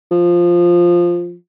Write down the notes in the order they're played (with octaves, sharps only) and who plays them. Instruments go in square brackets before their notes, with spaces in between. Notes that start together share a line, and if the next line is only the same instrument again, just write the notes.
[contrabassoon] F3